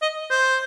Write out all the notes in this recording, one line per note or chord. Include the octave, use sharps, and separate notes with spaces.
D#5
C5